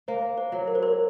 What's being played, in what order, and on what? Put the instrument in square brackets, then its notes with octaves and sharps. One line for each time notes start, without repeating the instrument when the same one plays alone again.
[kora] A#3 [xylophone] C5
[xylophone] C5
[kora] F#3
[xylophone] A#4
C5
A#4